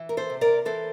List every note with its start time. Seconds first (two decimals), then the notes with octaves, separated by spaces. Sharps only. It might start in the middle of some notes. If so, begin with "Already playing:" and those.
Already playing: E3
0.09 A#4
0.17 A4 C5
0.30 C3
0.41 A#4 D5
0.65 E3 A4 C5